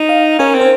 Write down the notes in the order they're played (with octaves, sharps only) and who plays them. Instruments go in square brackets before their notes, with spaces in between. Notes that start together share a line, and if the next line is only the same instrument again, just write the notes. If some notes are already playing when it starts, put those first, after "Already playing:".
Already playing: [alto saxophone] D#4
[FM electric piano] F5
[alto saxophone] C#4 [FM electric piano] A#4
[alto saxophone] C4
[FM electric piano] C5